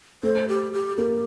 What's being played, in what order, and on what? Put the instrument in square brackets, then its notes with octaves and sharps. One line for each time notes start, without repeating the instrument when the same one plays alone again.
[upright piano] A3 [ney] C5
[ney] G4
G4
[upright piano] A#3 [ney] G4